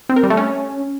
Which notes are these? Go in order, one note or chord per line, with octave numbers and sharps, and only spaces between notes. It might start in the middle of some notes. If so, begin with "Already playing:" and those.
C4
A#4
G3
A3
C#4